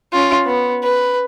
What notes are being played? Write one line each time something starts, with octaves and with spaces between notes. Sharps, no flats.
C#4 F4
B3
B4